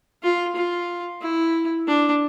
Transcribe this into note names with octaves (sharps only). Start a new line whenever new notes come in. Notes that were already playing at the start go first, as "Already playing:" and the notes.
F4
F4
E4
D4